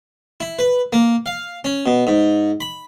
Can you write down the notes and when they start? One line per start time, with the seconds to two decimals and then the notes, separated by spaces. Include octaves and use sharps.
0.40 E4
0.59 B4
0.93 A#3
1.26 F5
1.64 C#4
1.86 B2
2.07 G#2
2.61 B5